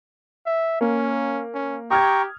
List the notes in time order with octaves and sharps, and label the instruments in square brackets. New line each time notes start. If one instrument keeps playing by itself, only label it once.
[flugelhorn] E5
[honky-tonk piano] A#3 [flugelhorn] C#4
[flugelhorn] C#4
[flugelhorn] G4 [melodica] G5 A#5 C#6 [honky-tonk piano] D#6 F6 G#6